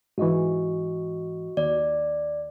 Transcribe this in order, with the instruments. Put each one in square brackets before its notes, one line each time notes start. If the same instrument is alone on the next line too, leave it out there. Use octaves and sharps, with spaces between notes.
[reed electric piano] G#2 E3 [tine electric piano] F#4 D#5 C#6
[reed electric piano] D#2 [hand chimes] D5